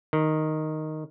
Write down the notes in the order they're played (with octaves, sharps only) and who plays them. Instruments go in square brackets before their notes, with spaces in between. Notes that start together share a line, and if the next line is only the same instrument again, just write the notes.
[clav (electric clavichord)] D#3